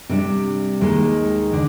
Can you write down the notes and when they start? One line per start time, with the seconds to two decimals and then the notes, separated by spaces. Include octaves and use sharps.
0.09 C3 G3 D4
0.81 D#2 D#3 G#3
1.53 D3